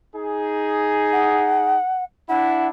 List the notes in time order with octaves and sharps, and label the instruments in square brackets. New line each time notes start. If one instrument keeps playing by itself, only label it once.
[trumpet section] D#4 G#4
[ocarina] F#5
[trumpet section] D4 E4 [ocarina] F#5